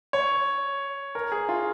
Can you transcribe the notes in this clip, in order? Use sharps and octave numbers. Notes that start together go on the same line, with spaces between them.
C#5
A#4
G#4
F4